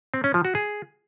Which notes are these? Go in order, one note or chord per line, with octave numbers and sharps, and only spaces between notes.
C4
C#4
F3
F#4
G#4